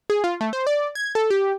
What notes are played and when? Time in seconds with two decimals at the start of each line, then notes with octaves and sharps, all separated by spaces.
0.10 G#4
0.24 F4
0.41 A3
0.53 C5
0.67 D5
0.95 G#6
1.15 A4
1.30 G4